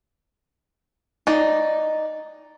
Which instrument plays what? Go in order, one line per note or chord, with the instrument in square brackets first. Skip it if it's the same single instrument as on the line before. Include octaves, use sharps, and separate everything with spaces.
[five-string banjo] D#4 D5